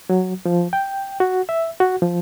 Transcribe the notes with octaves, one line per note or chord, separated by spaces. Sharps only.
F#3
F3
G5
F#4
E5
F#4
F3